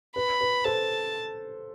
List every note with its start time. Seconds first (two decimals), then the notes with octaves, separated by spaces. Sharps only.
0.16 B4 B5
0.41 B4
0.65 A4 C5 A5